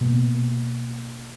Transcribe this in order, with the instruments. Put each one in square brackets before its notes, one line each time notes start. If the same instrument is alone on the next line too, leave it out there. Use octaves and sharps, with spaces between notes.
[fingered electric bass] B2 A#3